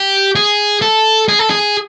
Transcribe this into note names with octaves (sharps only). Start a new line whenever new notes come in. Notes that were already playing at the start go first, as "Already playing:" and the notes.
Already playing: G4
G#4
A4
G#4
A4
G#4